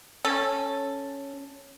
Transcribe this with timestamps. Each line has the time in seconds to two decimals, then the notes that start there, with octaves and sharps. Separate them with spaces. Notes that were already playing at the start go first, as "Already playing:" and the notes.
0.25 C#4 A4